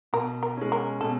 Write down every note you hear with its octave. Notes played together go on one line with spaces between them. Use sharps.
B2 A#4
A#4
G#3 C#4
A#4
B2 A4